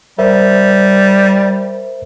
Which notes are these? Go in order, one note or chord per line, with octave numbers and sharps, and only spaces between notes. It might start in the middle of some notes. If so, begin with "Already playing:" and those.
G3 A#4 C5 E5